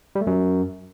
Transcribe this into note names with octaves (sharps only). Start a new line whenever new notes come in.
G3
A3
F#2